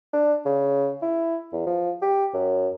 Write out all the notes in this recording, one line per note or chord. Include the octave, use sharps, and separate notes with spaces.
D4
C#3
E4
E2
F3
G4
F#2